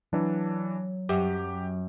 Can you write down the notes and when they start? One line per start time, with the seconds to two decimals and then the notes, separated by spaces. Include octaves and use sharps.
0.13 E3 F#3 D4
1.09 F#2 G4